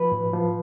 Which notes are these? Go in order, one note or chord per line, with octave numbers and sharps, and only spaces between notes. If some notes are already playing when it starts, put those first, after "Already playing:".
Already playing: F3 B4
A2
F3